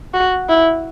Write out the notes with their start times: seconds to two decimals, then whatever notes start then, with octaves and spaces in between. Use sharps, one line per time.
0.14 F#4
0.49 E4